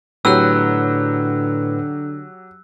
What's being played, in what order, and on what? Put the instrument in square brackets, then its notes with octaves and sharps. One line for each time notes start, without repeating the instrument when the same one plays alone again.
[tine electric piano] A2 B4 [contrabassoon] D3 [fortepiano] F#3 G4 [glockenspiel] E6 F#6